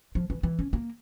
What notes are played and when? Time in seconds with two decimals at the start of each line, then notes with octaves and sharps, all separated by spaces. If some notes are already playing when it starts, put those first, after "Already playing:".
0.15 F3
0.30 E3
0.43 E3
0.59 C#4
0.73 A#3